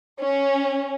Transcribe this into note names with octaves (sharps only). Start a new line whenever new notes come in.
C#4